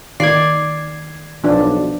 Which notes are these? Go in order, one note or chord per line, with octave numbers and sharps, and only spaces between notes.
D#3 D5 G#6 C7
B1 F3 D4